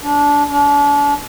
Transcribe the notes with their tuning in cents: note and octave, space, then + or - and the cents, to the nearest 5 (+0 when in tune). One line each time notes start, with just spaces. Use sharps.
D4 -20
D4 -35